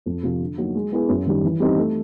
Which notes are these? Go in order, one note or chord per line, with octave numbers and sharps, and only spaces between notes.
F2
C3 F3
D3
F#3 A#3 D#4 F#4
G#3
B3 E4 G#4
F#2
D#3 G3
E3
G3 C4 D#4 G4
A3